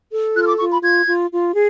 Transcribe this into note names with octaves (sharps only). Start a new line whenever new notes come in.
A4
F4 F#6
F6
D6
F4 C#6
B5
F4 G#6
F4
F4
G#4